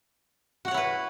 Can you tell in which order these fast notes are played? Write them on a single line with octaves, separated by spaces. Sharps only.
F#4 F#5 C#5 E4 B4